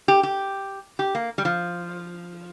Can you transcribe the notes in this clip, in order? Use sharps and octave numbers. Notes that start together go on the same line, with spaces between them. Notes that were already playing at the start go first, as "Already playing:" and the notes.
G4
G4
G4
A#3
G3
F3